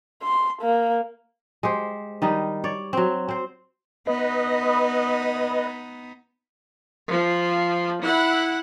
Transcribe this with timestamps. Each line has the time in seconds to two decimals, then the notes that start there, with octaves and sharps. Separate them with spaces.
0.22 C6
0.62 A#3
1.63 G#3 G4 C5
2.22 D#3 G3 D#4
2.64 C#5 D5
2.93 F#3 C4
3.29 C4 C5
4.07 B3 D#4 B4 D#5
7.10 F3
8.03 E4 F#5